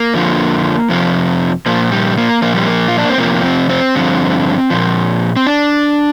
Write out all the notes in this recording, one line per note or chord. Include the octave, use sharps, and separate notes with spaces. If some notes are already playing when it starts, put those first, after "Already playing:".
Already playing: A#3
F2 D3 F3
F2 C3 F3
A#2 F3 A#3
G3
A#3
A#2 F3 A#3
G3
A#3
F4
D4
C4
F2 C3 F3 A#3
C4
C4
G2 D3 F3
A#2 F3
C4
D4